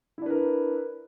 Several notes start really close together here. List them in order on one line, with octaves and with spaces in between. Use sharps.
E4 D4 B4 A#4